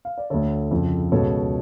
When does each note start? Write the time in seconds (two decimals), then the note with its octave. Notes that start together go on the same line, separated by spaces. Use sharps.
0.05 F5
0.18 D5
0.30 D2 D3 A4 C#5
0.71 F2 C#3
1.12 C#2 B2 A4 C#5